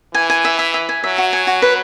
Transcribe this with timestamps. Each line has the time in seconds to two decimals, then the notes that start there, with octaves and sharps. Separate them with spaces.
0.14 E3 G#5
0.30 G#5
0.45 E5
0.59 E5
0.74 E5
0.89 G#5
1.03 F#3 E5
1.18 F#4
1.33 G#5
1.47 F#4
1.62 B4